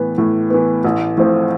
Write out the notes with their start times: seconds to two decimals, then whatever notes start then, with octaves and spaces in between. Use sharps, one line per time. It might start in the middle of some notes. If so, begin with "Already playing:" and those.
Already playing: A2 E3 B3
0.18 A2
0.50 E3 B3
0.85 A1
1.17 A2 F3 C4